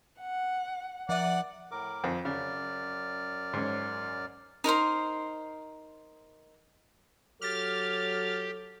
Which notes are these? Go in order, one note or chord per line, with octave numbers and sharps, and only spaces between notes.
F#5
F3 D5 E5 F#5
A2 A#4 D6
F2 C4
F#2 C#3 D5 F6
G#2 C#4
D#4 A#4 C5 C6
F#3 G4 A4 F6 A6